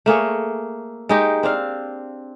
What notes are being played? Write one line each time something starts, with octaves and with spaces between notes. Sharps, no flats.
A3 A#3 G#4 C#5
G#3 D#4 G4
C4 D4 F5